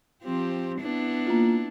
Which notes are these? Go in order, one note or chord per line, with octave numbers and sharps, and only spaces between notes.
F3 C4 G4
B3 D4 E4
A#3 F4